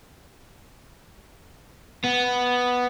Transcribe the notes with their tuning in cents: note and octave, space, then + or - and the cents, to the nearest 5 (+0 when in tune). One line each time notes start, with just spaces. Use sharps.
B3 +0